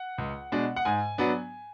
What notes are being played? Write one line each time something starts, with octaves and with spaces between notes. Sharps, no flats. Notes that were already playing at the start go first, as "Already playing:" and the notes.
Already playing: F#5
C#2
B2 G#3 D4
F#5
G#2 G#5
F#3 B3 D4